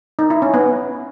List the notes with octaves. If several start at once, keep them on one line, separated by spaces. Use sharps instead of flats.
D#4
E4
C#4
B3